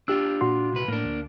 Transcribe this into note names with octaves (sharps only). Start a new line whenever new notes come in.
D4 F4 G4 E6
A#2 F#4 C6
C2 B4
A2 A#3 D4
D2